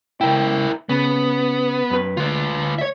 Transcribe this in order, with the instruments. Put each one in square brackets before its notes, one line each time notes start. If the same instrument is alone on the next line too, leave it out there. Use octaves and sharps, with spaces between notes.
[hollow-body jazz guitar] C#2 G2 G5 [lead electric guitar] E4 A#4
[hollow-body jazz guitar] C#3 [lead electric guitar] B3
[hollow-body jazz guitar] F#2 B4
[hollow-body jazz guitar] D2 [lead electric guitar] F4 B4
[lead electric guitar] C#5 E5